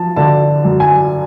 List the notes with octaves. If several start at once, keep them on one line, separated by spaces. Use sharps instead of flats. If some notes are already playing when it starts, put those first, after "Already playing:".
Already playing: F3 A5
D3 A5
F#2
G#5